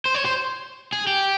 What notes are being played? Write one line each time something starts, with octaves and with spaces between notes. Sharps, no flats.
C5
C#5
C5
G#4
G4